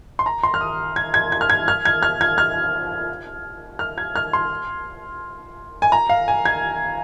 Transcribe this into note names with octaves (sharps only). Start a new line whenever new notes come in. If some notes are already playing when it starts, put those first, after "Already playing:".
C6
A#5
C6
F6
D#6
G#6
G#6
G#6
F6
G#6
F6
G#6
F6
G#6
F6
F6
G#6
F6
C6
G#5
A#5
F5
G#5
G#6